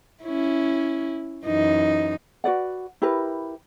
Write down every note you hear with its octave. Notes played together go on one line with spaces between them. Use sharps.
C#4 E4
F#2 E3 D#4
F#4 B4 D5 F#5
E4 G4 A#4 B4